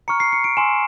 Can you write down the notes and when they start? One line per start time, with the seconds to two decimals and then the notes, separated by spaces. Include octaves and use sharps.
0.08 A#5 C#6 F6 C#7
0.20 C7
0.33 C#7
0.44 D7
0.57 G#5 C6 E6 E7